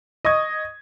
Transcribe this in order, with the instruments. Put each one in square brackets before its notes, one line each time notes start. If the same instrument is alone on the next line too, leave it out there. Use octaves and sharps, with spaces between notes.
[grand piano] D#5 C#6 D#6 G#6